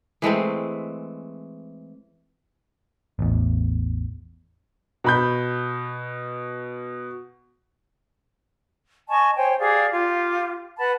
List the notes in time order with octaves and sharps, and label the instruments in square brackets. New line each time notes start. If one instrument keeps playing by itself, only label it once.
[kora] E3 G#3 A3 C4
[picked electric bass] A1 E2
[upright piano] B2 B5 G6
[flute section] D#5 G#5 A5 C#6
C5 C#5 G5 G#5
G4 G#4 D5 F5
F4 G4
B4 F#5 A5 B5